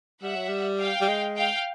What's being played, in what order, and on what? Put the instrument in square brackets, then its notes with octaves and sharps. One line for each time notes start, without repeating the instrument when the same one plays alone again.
[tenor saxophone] G3 [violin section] E5 F#5
[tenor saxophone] F#3
G3
[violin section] F5 G5
[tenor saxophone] G3
G#3
[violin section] F5 G5